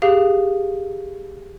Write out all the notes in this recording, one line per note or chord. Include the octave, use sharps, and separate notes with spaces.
G4 G#4 F5